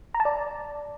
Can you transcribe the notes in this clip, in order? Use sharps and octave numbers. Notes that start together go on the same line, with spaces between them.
A#5
A5
D5